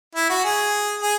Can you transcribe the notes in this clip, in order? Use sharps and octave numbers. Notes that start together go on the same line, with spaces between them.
E4
F#4
G#4
G#4